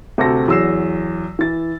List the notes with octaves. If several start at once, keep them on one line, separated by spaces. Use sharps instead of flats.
D2 C3 F#4 A4 A#6
E2 F#3 E6 C7 E7
E3 A6